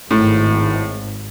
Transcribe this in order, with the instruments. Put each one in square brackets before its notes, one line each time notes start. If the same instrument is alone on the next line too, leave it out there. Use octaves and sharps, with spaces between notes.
[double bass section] G#1 [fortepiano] A2